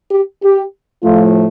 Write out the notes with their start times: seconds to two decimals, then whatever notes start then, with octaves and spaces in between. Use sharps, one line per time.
0.11 G4
0.42 G4
1.03 A2 F3 A3 F4